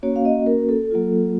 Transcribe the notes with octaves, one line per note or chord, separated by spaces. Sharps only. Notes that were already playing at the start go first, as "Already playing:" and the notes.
A#3 C#4 F#4 C#5
F5
D#5
A#4
A4
F#3 A#3 F4